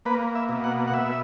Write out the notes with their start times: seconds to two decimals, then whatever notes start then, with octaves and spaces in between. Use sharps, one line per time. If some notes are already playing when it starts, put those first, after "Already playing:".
0.05 A#3 B4
0.35 E5
0.49 B2
0.64 F#5
0.88 F#5
0.93 B2 E5